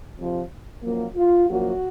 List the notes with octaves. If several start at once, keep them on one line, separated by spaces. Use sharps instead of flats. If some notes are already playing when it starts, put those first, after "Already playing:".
F2 C3 F3
F#2 F3 A#3
F4
F#2 F3 A#3 F#4